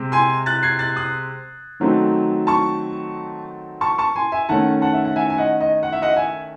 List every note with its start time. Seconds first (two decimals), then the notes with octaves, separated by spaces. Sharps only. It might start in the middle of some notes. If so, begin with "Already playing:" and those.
Already playing: C3 G#3 C4
0.12 G#5 C6
0.46 F#6 A6
0.63 G#6 C7
0.79 F#6 A6
0.96 D#6 F#6
1.80 D#3 F#3 A3 C4 D#4
2.47 A5 C#6
3.81 A5 C#6
3.98 A5 C#6
4.16 G#5 C6
4.32 E5 G#5
4.49 D#3 A3 C#4 F#5 A5
4.82 F#5 A5
4.93 E5
5.05 F#5
5.16 E5 G#5
5.30 G#5
5.38 D#5 F#5
5.61 D#5
5.83 F#5
5.92 E5
6.02 D#5 F#5
6.16 E5 G#5